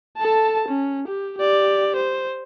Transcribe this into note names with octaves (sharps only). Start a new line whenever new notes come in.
A4 A5
C#4
G4
G4 D5
C5